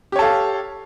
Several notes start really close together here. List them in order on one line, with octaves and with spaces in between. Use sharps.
G4 C#5 A4 F5